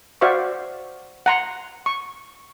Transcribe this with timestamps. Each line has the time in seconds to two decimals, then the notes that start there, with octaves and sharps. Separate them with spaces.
0.21 F#4 C5 D5 E5 F5 C#6
1.26 F#5 A#5 C6
1.86 C#6